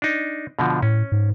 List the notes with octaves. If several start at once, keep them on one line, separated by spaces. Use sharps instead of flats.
D4 D#4
B2 D3 F3
A2 C#4
G#2